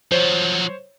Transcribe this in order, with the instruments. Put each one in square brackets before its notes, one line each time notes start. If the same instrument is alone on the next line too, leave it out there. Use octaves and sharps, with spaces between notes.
[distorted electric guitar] F3 F#3 [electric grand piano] C5 C#5